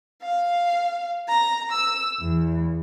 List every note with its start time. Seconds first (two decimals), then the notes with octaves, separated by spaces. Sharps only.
0.22 F5
1.27 A#5
1.71 E6
2.20 E2